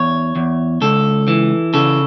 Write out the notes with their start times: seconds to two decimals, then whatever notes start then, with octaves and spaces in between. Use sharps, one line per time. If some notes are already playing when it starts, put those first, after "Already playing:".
Already playing: E2 C#5
0.36 E2
0.81 C#2 A4
1.28 E3
1.74 C#3 A4